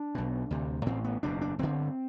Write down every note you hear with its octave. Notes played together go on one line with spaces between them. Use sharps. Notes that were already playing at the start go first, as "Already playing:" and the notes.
Already playing: D4
B1 B2
D2 C3
A1 A2 C4
B3
F#1 E2 B2 D4
D4
G1 G2 D3 C4